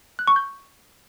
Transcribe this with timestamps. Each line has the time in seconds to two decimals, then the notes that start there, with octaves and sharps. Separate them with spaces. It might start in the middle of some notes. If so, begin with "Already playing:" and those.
0.19 F#6
0.28 C#6
0.36 G6